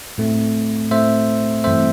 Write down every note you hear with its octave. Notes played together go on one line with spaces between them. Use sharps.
A2 A3 C4
A2 A3 C4 C5 E5
G2 E3 A3 C4 C5 E5